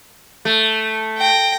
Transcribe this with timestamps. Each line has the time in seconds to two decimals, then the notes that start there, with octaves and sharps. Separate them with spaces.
0.45 A3
1.18 G5 A#6